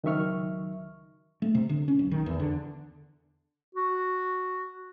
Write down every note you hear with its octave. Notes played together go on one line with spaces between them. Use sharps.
C#2 D#3 F#3 E5 C#6 F6
A3
C3
D3
C#4
B1
D#3
E2
D3
F#4